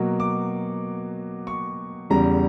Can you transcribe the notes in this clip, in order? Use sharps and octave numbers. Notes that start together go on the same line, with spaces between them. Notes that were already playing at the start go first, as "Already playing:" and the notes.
Already playing: B2 F#3 A#3
D6
C#6
E2 C#3 G3 A#5